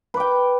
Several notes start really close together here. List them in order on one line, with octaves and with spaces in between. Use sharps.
B4 D6 G5